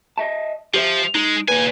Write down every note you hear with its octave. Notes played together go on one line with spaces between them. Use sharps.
D#5 E5 A5
F3 G4 C5 E5
G#3 D#4
D#2 A#2 B4 G#5